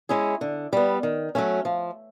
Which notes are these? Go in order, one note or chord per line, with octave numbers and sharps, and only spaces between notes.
G#3 C#4 E4 G#4
D3
G3 B3
D#3
F#3 A3 C#4
F3